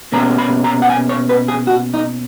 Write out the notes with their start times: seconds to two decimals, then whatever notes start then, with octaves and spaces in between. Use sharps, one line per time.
0.13 B2 A#3 C#4 A#5
0.38 B5
0.64 A#5
0.82 F#5
0.90 G#5
1.09 C#5
1.29 B4
1.48 G#4
1.67 F#4
1.94 D#4